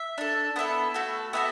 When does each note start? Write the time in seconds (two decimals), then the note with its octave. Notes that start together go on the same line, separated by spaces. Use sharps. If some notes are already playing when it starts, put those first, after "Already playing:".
Already playing: E5
0.18 D4 A4
0.56 B3 E4 A4 F#5
0.94 A3 F#4 A4
1.33 B3 F#4 A4 E5